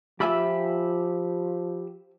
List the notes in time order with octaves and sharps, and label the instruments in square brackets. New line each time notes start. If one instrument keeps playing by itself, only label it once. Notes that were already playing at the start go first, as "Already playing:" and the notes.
[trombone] F3 [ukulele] F4 E5 G#5 [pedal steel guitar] G4 B5 E6